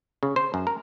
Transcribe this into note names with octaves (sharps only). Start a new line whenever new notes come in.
C#3
C5
F#2
A#4